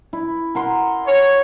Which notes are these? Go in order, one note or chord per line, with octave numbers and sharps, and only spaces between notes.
E4
A#4 F#5 C6
C#5